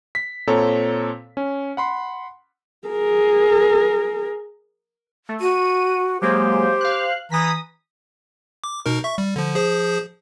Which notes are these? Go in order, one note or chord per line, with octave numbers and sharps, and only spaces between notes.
B6
A#2 C4 A4 C#5 A#5
C#4
F#5 B5 C6
G#4 A#4
A3
F#4 D#7
F#3 G#3 A#3 G4 C5
F5 F#6
E3 A#5 D#6 A#6 B6
D6
B2 D#4 A#4
E5 C#6
G3
D3 F3
F3 G#4 C5